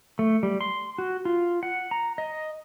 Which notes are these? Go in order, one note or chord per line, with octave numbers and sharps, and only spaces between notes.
A3
G3
C6
F#4
F4
F#5
A#5
D#5